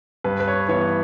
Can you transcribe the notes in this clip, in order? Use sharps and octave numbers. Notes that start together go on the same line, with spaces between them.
G2 B4
B4
C#5
E3 B3 C#5